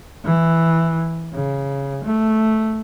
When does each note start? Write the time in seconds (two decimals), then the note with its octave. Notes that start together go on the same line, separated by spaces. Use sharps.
0.25 E3
1.33 C#3
2.04 A3